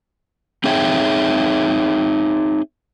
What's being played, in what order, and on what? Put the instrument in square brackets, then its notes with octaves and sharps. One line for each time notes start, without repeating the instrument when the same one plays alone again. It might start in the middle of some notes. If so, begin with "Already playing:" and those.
[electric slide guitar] C4 D#4 G#4 C#5 E5 G5